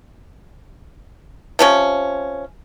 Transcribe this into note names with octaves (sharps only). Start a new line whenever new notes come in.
C3 F3 C#4